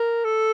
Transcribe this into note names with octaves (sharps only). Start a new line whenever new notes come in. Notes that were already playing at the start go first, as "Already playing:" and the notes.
Already playing: A#4
A4